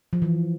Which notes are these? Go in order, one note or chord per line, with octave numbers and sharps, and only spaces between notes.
F3
E3